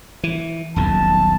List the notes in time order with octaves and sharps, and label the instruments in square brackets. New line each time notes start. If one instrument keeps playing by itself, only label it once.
[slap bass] E3
[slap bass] D#1 B1 E2 [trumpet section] A5